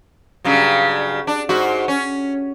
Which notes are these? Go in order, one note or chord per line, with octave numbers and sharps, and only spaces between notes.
G2 C#3 F#3
D4
G#2 F#4
C#4